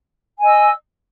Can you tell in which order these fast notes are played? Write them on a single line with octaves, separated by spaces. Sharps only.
G#5 D#5 E6